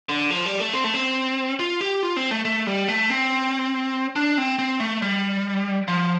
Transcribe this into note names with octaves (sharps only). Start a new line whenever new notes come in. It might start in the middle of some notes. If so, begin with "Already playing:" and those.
D3
F3
G3
A3
C4
A3
C4
F4
G4
F4
C4
A3
A3
G3
A3
C4
D4
C4
C4
A3
G3
F3